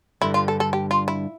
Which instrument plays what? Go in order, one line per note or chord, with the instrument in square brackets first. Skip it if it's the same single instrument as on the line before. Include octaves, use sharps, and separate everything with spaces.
[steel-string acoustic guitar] G2 D3 G3 [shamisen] E4
[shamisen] F4
A4
A4
G4
F4
E4